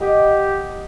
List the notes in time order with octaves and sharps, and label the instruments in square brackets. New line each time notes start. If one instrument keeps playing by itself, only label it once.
[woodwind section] G4 [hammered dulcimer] D#5 F#5